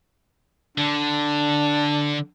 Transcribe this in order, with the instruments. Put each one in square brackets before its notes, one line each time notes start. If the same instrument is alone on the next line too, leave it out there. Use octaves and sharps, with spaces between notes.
[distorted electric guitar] D3 [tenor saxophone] D4